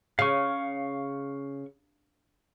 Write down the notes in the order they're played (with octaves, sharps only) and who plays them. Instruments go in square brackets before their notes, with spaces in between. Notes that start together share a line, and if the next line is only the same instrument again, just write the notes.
[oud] C#3 [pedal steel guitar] F5 C#6